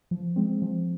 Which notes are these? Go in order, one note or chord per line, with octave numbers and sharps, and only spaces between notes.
F3
G#3 C4
F3